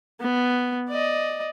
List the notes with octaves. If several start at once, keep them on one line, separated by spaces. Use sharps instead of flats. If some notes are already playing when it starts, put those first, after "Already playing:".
B3
D5 D#5